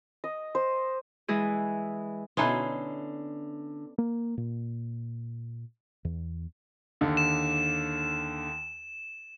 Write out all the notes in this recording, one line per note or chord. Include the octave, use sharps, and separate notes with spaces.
D#5
C5
E3 G#3 E4 G#4
B2 D3 B3 C#4 D#4 E4 C6
A#3
A#2
E2
D#2 D3
E7